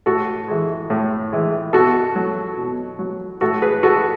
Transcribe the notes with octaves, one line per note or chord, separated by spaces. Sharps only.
A2 F#4 A4
E3 G#3
A2
E3 G#3
B2 F#4 A4
F#3
B2
F#3
A2 F#4 A4
G#4 B4
G#3 F#4 A4